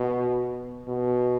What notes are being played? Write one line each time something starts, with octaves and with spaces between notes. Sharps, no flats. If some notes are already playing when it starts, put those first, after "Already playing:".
Already playing: B2
B2